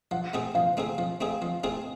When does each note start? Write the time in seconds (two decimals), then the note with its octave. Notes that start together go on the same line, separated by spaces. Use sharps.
0.11 F3 F#5
0.33 A3 C4 D#4 G#4
0.55 F3 F5
0.77 A3 C4 D#4 G#4
0.98 F3
1.21 A3 C4 D#4 G#4
1.42 F3
1.64 A3 C4 D#4 G#4